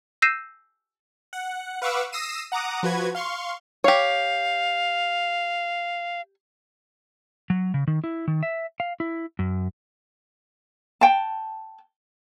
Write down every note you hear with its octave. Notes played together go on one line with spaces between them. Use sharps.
E6 G6 A#6 C7 D#7 E7
F#5
B4 F5 F#5 C#6 D6 E6
D#6 E6 A#6 C7 D#7 E7
F#5 A#5 D6 D#6
F3 F#4 B4 G#6
F5 C6 C#6
G4 C#5 F5
F#3
C#3
D#3
E4
D#3
E5
F5
E4
F#2
G5 A5